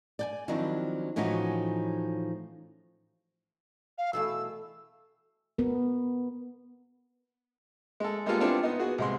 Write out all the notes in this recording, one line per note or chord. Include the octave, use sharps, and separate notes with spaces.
D5 G5 G#5
D#3 F3 F#3 C4 D4 E4
A2 E3 F3 C#4 D#4 F#4
F5
B2 E3 A3 E6
B3 A#4
G#3 A4
G3 G#3 A#3 B3 F4 A4
B3 C4 D4 E4 F4 A4
B3 D#4
B3 F#4 G#4
C2 G#3 C6